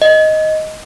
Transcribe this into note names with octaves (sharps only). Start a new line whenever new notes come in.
D#5